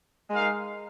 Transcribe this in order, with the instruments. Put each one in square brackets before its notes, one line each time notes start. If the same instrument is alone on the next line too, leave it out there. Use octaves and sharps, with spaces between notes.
[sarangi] G#3 [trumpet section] D#4 A#4 F5